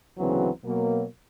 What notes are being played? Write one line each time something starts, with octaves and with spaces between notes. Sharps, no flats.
D2 C#3 E3 F#3 B3 C4
B2 F#3 A#3